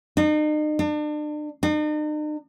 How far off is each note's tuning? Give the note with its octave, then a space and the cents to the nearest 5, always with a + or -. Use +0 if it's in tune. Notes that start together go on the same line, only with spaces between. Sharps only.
D#4 -40
D4 +35
D#4 -45